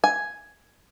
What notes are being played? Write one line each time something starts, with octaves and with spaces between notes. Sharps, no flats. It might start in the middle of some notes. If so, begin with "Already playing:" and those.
G#5